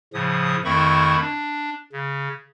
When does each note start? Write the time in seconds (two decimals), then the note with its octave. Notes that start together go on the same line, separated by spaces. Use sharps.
0.13 A2 C#3 F3 D#6
0.65 F2 D#3 A3 E4 B5 C#6
1.21 D4
1.93 C#3